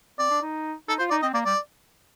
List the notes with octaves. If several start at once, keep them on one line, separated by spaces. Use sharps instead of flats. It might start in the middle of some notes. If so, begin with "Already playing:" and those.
C4 D5
D4
D#4
D#4 A4
F4 C5
D#4 D5
C4 D#5
A#3 D5
G3 D5